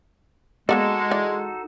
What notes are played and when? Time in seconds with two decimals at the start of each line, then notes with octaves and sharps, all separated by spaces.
0.69 G#3 A#3 B3 D#4 F#4 A4 D5
1.11 E3 D5